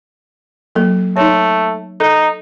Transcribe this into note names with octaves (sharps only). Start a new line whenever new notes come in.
F#3 A#3 A4
A3 D#4 C#5
D#4 A4